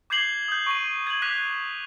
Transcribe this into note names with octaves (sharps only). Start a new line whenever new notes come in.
D6 G6 G#6 C7 F#7 G7
D#6 G6
C#6 D#7
G#6 F#7
D6 F#6 B6 D#7 F7